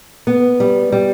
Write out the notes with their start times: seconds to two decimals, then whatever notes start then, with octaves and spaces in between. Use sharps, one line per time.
0.27 B3
0.60 G3
0.92 G3